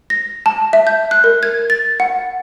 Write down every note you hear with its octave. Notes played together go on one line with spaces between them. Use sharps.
A#6
A5
E5
G6
F#6
A#4
G#6
A6
F#5